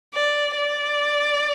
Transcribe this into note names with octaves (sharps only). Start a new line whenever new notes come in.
D5
D5